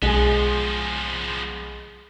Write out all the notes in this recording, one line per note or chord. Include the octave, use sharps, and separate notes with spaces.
B1 F3 G#3 B3 G#4